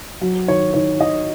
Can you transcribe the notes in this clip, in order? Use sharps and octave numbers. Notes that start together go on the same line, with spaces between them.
F#3
D#3 C#5
D#3 C#5
D#3 D#5